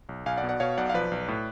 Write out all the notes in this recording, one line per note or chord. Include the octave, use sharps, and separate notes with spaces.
B1
B1 F5 G#5
D5 F#5
B2
D5 F#5
B2 C#5 F5
B1 D5 F#5
F5
F3 B4 D5
B1
A2